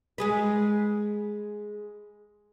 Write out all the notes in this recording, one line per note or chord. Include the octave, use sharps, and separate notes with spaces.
G#3 G#4 B4